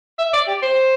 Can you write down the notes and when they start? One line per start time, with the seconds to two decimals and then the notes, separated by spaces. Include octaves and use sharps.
0.19 E5
0.33 D5
0.47 G4
0.62 C5